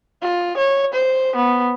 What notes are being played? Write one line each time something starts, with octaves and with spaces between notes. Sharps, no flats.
F4
C#5
C5
B3